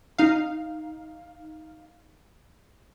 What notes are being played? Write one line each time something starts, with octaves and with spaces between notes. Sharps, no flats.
D#4 F5